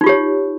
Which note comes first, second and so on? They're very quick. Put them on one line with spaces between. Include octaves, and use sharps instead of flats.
D#4 F4 G4 C#5